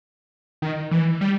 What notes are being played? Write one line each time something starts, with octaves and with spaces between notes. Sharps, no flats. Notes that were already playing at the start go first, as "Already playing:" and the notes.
D#3
E3
G3